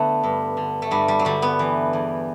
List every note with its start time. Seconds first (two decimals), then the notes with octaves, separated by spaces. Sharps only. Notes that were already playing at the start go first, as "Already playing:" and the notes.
Already playing: D3 A3 B3
0.24 G2
0.57 D3
0.82 A3
0.91 G2 G3
1.08 G3
1.19 F#3
1.25 D3 G3
1.42 B3
1.59 E3
1.93 E2